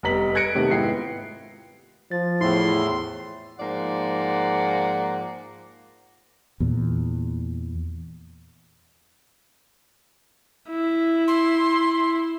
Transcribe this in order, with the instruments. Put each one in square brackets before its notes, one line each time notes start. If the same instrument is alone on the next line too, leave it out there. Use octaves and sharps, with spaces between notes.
[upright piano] F1 G3 B3 A#5 B6 F#7
F#6 G#6 A#6 C#7 D7
C3 D#3 A3 B3
G#2 B3 E4 F4 G5 C7
[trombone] F3 [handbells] A6
[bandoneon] E2 A2 [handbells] E4 C7 [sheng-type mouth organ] C6
[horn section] G#2 F3 A#3 D5 F#5
[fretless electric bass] E2 A#2
[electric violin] E4
[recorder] C6